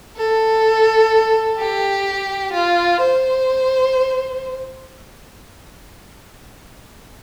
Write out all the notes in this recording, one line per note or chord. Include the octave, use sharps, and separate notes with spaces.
A4
G4
F4
C5